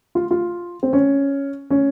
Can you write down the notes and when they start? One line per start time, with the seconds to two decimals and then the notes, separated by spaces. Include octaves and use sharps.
0.15 F4
0.31 F4
0.83 C4
0.93 C#4
1.71 C#4